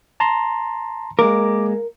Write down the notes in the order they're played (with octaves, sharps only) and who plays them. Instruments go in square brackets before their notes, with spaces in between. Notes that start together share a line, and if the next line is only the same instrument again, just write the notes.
[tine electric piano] A5 A#5 C6
[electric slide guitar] G#3 A#3 [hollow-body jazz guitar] A#4 [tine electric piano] D6